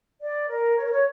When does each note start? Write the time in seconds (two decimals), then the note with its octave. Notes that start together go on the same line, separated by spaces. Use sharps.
0.22 D5
0.49 A#4
0.76 C#5
0.84 A#4
0.91 C#5